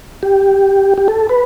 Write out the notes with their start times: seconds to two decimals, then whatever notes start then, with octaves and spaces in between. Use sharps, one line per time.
0.23 G4
0.98 G4
1.08 A4
1.29 B4